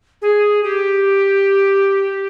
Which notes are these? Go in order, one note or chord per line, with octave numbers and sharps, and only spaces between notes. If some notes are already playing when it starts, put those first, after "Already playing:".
G#4
G4